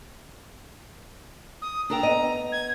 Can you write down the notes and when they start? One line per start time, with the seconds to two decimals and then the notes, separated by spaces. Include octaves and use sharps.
1.62 D#6
1.90 D4 A4 G5 A#5
2.03 B3 D#5
2.52 G#6